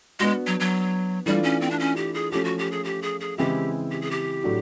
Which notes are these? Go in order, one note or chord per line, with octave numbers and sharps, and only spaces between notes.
G#3 B3 D4 F#4
F#3
F#3
E3 G3 A3 D4 F4
C#4
C4
D4
C#4
G4
G#4
F3 A3 C#4 G4
F#4
G4
G#4
G4
G#4
G#4
C#3 E3 G#3 C4 E4 G4
G4
G#4
G4
A2 F#3 A3 D4 F#4